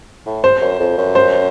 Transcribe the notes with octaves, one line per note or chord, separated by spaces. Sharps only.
A2
C5
F#2
F2
F#2
C5